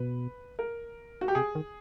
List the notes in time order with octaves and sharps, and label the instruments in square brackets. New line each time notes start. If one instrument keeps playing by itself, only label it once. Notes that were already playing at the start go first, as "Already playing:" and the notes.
Already playing: [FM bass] B2 [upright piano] B4
[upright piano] A#4
F#4
G4
[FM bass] C3 [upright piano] G#4
[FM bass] D#3